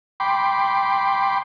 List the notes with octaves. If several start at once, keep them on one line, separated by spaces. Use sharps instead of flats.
G5 B5 C6 D6